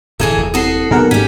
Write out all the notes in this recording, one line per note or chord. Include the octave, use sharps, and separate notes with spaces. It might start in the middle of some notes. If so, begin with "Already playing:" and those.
D1 G2 E3 G#4 A4
D#1
C2 F#4 A4 D#6 C7
B1 B2 D#3 A#3 G#4 A#4 F#5
G#1 G3 C#4 G4 B6